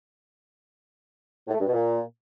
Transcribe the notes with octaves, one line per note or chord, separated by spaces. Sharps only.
A2
A3
G2
B2
A#2